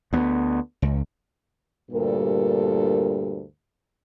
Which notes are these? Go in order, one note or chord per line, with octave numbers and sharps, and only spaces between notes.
D2 B3
C#2
D2 G2 A#2 G3 A4 A#4